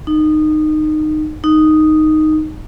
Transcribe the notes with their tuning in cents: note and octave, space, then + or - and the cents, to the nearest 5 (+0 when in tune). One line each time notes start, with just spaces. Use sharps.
D#4 -20
D#4 -5